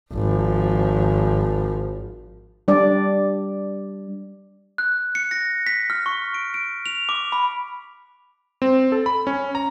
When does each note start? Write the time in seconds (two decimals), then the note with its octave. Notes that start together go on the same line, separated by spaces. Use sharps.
0.13 G#1 F3
2.68 G3 D4 D5
4.78 F#6
5.15 C#7
5.31 A#6
5.67 B6
5.90 F6
6.06 C#6
6.34 D7
6.54 D7
6.86 F7
7.09 D6
7.32 B5
8.62 C4
8.92 A4
9.06 B5
9.27 C#4
9.55 A#5